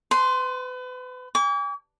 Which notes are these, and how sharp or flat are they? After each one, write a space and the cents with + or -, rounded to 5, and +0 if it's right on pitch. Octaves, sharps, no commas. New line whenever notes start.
B4 +35 C6 -5
G#5 -40 D6 -40